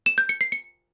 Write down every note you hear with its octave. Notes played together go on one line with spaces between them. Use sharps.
E7
G6
C#7
C7
C#7